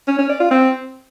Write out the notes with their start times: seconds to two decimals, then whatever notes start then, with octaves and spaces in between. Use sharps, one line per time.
0.08 C#4
0.18 C#4
0.29 D5
0.40 F4
0.51 C4